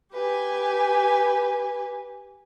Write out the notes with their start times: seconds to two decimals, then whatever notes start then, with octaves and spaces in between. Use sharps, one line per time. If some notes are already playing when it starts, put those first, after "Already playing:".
0.12 G4 B4 G#5